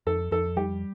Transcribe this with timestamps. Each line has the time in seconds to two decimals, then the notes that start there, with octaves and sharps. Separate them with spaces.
0.07 F2 A4
0.31 F2 A4
0.57 G3 G4